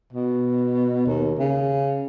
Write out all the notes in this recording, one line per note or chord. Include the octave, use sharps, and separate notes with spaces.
B2
D#2
C#3